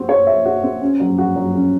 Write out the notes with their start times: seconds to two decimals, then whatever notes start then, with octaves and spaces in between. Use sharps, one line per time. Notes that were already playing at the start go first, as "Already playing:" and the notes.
Already playing: C4 F#4
0.09 C#5
0.27 E5
0.45 F#4
0.63 C4
0.81 C#4
1.00 F#3
1.18 F#4
1.36 F#3
1.55 C#4